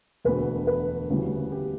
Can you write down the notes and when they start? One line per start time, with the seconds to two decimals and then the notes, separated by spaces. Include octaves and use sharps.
0.25 E1 D2 D3 B4
0.67 B4
1.10 D2 C#3 E3 G3
1.52 G4